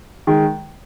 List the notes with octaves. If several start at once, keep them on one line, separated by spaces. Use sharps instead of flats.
D#3 G#3